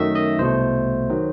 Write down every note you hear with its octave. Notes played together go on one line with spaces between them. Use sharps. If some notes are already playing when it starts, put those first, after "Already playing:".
Already playing: F#2 D#3 F#3 A3 D#5 E5
D#5
C2 B2 A3 C5
D#3 F#3